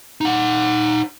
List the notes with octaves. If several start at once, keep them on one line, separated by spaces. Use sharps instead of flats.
D#4 F#5